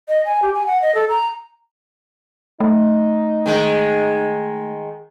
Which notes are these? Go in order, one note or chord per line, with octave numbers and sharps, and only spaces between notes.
D#5
G#5
G4
G#5
F#5
D#5
A4
A#5
A3 D#4
D#3 G#3